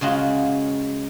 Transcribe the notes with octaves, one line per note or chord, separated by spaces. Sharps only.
C#3 G#3 F4 F#4